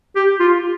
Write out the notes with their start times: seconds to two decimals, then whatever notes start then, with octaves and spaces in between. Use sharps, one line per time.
0.15 G4
0.39 F4